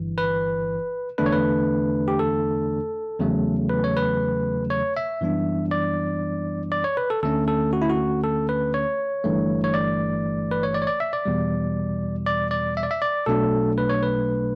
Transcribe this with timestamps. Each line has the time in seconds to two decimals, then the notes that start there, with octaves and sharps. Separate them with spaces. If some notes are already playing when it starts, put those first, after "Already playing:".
Already playing: G1 G2 E3
0.18 B4
1.18 E2 D3 A3 D4 B4
1.26 C#5
1.32 B4
2.08 G4
2.19 A4
3.20 E2 C#3 F#3 A3
3.70 B4
3.84 C#5
3.97 B4
4.70 C#5
4.97 E5
5.21 F#2 E3 G3 B3 D4
5.71 D5
6.72 D5
6.84 C#5
6.97 B4
7.10 A4
7.23 D2 D3 A3 C#4 A4
7.48 A4
7.73 F#4
7.82 E4
7.90 F#4
8.24 A4
8.49 B4
8.74 C#5
9.24 G1 G2 E3 A3
9.64 C#5
9.74 D5
10.51 B4
10.63 C#5
10.74 D5
10.82 C#5
10.87 D5
11.00 E5
11.13 D5
11.25 E2 B2 G3
12.26 D5
12.51 D5
12.77 E5
12.83 D5
12.91 E5
13.02 D5
13.26 B1 B2 F#3 A3 D4 A4
13.78 B4
13.89 C#5
14.03 B4